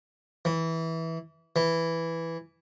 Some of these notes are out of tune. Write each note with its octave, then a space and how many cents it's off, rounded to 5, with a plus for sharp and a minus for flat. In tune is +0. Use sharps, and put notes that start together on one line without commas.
E3 -15
E3 +0